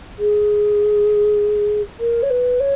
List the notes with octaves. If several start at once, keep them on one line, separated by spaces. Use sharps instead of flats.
G#4
A#4
C#5
B4
C#5